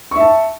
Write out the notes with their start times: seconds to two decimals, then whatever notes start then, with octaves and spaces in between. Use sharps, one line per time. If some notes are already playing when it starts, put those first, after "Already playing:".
0.11 C#6
0.16 E5
0.20 A5